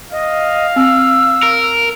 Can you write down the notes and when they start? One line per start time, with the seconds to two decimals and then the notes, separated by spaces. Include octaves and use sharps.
0.12 D#5 F5
0.76 C4 E6
1.43 A#4